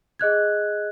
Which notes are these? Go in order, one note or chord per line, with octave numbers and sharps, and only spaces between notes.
G#4 D#5 F#6 G#6